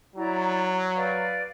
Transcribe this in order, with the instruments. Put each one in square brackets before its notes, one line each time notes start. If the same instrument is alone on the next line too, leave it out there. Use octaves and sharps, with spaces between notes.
[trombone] F#3 [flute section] E4 D5 A#5
[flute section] B4 D5 F5